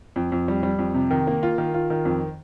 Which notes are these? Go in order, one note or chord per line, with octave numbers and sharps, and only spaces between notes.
F2
F2
G3
G3
F2
C3
D#3
A#3
F4
D#3
F4
D#3
F2